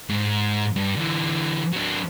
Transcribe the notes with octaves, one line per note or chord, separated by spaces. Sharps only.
G#2
G2
D3 E3
F#3 D4